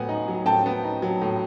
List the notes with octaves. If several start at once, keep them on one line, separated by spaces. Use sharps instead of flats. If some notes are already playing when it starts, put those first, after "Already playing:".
Already playing: A2 F#3 B3 F#5 G#5
D#4
F#3
A2 G5 A5
B3
D#4
F#3
A2